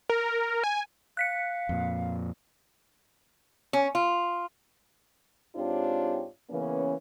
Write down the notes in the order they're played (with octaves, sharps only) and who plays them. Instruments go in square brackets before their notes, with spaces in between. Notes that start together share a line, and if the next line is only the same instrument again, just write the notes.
[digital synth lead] A#4
G#5
[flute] F5 [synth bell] F#6 B6 C#7
[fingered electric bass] F2 A#2
[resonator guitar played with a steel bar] C#4
F4
[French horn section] G#2 C4 D4 F4 G4 C#5
C#3 E3 A#3 B3 C#4